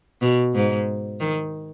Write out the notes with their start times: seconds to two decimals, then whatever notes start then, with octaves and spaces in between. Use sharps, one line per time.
0.22 B2
0.55 G#2
1.20 D#3